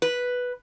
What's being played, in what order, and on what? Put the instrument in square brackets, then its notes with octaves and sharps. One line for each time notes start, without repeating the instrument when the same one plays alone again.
[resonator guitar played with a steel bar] B4